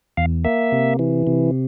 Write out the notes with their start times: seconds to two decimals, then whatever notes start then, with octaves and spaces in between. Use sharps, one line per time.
0.17 E2 F5
0.45 A#3 E5
0.72 C3
0.99 E3
1.27 C3